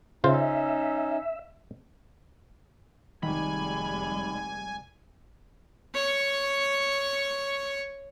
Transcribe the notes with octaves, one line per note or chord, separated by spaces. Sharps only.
C#3 C#4 D#4 F4 C5 E5
F1 D#3 G3 G#3 G#5 B5
C#5 C#6